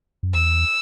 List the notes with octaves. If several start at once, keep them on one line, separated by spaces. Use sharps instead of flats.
F#2
E2 E6